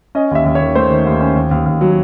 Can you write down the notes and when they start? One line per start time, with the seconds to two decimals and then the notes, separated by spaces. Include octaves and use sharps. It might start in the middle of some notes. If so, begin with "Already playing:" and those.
0.15 C#4 D#5
0.31 D#2 E5
0.45 D#2
0.55 C#5
0.61 D#3
0.75 A3 C5
0.90 D#3
1.06 D#2
1.21 C#4
1.35 D#2
1.51 D#2
1.66 D#2
1.81 F#3